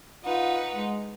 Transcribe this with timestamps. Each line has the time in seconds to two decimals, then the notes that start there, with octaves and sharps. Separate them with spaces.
0.24 D#4 F4 B4 F#5
0.75 G#3